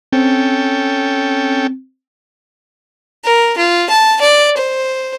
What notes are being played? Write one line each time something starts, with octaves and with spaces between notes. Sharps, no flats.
C4 C#4 A4 G5
A#4
F4
A5
D5
C5